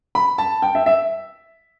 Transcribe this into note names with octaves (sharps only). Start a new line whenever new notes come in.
B5
A5
G5
E5
E5